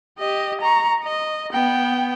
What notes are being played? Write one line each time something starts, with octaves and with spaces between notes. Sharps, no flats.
G4 D#5
A#5 C#6
D#5
B3 G5